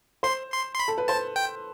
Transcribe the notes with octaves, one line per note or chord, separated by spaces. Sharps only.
C5 C6
C6
C6
B5
A4
B4
C5 A5
G5